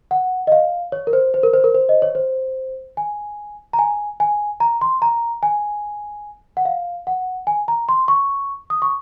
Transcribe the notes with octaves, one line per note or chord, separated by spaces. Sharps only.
F#5
D#5
F5
C#5
A#4
C5
C5
A#4
C5
A#4
C5
D#5
C#5
C5
G#5
A#5
G#5
G#5
A#5
C6
A#5
G#5
F#5
F5
F#5
G#5
A#5
C6
C#6
D#6
C#6